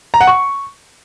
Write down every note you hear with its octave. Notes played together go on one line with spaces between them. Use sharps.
A#5
F#5
C#6